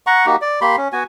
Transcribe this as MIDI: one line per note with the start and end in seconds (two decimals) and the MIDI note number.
0.07 0.26 78
0.07 0.26 82
0.07 0.26 85
0.26 0.36 58
0.26 0.36 63
0.26 0.36 66
0.26 0.36 67
0.41 0.60 74
0.61 0.76 58
0.61 0.76 67
0.61 0.76 83
0.61 0.76 84
0.77 0.88 61
0.93 1.04 59
0.93 1.04 66
0.93 1.04 80